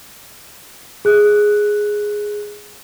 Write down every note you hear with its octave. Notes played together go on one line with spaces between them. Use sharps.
G#4 F#6